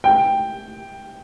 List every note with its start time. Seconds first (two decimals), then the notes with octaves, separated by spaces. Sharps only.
0.04 G5